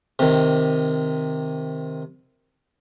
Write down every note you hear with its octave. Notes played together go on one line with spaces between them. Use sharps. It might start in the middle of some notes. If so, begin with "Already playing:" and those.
C3 D#3